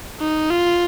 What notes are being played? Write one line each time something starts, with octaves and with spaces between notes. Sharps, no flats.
D#4
F4